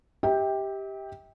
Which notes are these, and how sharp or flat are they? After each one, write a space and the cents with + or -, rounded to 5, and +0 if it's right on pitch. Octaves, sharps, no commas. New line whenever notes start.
G4 +0 E5 -45 G5 +10